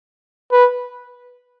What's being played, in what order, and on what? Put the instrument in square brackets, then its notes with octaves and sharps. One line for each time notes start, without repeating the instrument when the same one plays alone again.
[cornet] B4